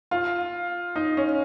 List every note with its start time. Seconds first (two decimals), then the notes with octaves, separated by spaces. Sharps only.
0.11 F4
0.96 D#4
1.17 C#4